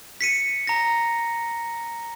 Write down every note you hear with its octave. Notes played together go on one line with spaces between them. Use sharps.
B6 C#7 D#7
A#5 A#6